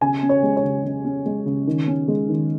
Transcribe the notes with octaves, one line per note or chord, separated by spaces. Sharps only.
C#3 G#5
C#4
C#5
G#3
C#5
C#3
C#3
C#4
G#3
C#3
D#3
C#4
G#3
D#3